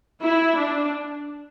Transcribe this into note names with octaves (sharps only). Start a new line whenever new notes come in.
E4
D4